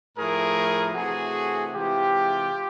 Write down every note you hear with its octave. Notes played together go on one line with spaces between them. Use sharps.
A2 F3 A3 G#4 A#4
C3 E3 A3 F#4 G#4
C3 E3 G#3 F4 G4